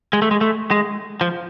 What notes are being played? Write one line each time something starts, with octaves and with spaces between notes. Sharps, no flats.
G#3
A3
G#3
A3
G#3
F3